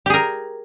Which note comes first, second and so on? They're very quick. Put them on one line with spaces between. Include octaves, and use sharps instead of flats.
G4 G#4 A#4